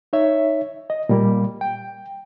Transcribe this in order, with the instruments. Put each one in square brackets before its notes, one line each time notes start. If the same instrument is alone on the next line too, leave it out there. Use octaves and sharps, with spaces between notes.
[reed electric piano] D#4 C#5 E5
D#5
A#2 G3 A#3
G5